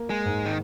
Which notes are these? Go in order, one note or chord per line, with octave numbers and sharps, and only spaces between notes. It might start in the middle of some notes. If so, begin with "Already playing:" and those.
Already playing: A#3
G#3
G#2
D#3